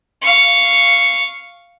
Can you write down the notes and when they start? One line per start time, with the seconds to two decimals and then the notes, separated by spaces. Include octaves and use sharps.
0.22 F5 C#6